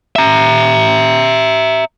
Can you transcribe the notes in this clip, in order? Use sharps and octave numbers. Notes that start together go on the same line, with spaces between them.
E5 A#5